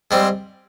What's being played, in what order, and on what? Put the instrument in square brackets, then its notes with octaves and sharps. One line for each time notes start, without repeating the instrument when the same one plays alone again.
[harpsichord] G#2 G3 C4